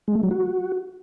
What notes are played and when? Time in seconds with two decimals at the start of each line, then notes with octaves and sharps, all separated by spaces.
0.08 G#3
0.15 A3
0.23 F#3
0.31 F#4